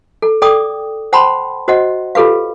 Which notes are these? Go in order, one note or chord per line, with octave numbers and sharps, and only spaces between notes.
A4
A4 D5 G5 D6 D#6
C5 F#5 G5 A5 B5 C6
F#4 C5 D#5 F#5
F4 G4 A4 B4 F5